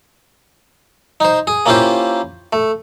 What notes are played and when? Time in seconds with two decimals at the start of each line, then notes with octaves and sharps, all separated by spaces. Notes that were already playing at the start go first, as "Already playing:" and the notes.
1.20 D#4 C5
1.47 G#4
1.66 A#3 C#4 E4 F4 G4 C5
2.53 A3